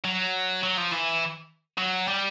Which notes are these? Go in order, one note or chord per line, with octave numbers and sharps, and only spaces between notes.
F#3
F#3
F3
E3
F#3
G3